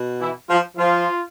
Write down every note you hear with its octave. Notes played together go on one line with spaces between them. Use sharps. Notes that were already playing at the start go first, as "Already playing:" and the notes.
Already playing: B2
E3 E4
F3 F4
F3 F4